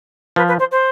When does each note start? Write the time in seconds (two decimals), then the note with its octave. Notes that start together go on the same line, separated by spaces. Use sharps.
0.36 F3 B4
0.48 B4
0.59 C5
0.71 C5